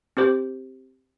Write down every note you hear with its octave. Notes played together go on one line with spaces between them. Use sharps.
C4 G4 C5 D6